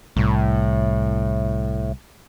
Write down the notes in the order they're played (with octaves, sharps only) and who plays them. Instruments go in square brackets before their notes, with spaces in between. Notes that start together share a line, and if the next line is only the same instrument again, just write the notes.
[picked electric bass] C2 [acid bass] A2